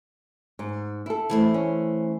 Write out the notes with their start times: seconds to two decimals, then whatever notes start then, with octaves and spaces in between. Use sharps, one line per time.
0.59 G#2
1.06 E4 A4
1.30 E3 A3 C5
1.54 C#4